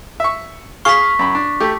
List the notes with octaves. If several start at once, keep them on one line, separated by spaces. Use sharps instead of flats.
E5 C#6
G#4 F5 C#6 B6
F#2 B5
D4
A3 G4